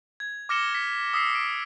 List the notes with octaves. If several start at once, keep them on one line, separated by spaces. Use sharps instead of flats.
G#6
D6 F6 A#6 C#7 E7 G7
B6
D#6 E6 B6 C7
D7